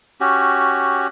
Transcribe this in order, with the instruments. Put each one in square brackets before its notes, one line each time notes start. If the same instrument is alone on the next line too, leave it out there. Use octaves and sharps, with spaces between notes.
[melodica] C#4 F#4 G4